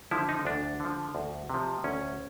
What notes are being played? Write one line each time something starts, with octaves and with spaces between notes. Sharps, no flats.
D3 F3 E4
D#4
D2 D4
D3 F3
D2
C3 F3
D2 C#4